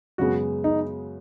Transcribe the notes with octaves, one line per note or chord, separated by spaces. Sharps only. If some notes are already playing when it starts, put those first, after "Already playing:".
F#2 C#3 G#3 B3 F#4
D#4